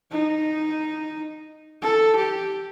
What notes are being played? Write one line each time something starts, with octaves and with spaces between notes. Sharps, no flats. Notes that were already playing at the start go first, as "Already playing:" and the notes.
D#4
A4
G4